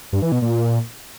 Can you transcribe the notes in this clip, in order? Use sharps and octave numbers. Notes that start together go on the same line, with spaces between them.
G2
E3
B2
A#2